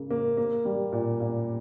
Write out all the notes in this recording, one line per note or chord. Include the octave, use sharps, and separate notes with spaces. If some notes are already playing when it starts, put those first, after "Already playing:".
Already playing: C#3 A#3
A#3
A#3
G3
A#2
A#2